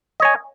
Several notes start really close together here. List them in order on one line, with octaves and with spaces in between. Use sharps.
D#5 C#5 G#5